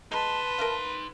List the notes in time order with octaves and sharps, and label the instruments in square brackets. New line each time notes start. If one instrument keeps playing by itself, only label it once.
[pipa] G#3 [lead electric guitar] D#4 C6 [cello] B4 [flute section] A5
[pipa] A#4 E5 F5